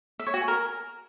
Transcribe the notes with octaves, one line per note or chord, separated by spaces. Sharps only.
E5
C#5
F#4
G#5
A#4